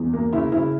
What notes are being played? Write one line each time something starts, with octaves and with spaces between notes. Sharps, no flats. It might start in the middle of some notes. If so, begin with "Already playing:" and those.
Already playing: E2
A#3
C#3 E4
C#3 E4